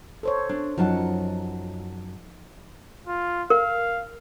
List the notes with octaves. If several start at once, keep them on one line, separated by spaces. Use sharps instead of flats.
A4 C5 C#5
D4
F#2 F3 F#3 D#4 F#5 A5
F4
A#4 F5